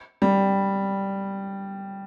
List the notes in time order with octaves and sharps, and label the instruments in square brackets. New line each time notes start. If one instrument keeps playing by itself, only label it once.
[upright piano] G3